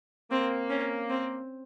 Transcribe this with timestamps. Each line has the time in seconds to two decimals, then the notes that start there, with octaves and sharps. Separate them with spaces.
0.31 A#3 C4
0.70 C#4
1.09 C4